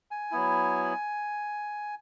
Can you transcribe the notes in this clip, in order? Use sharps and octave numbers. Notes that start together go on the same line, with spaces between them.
G#5
F#3 B3 E4